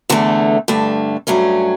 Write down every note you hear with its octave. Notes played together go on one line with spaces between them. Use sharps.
E2 D3 A3
G2 D3 A3
G2 F#3 A3 C#4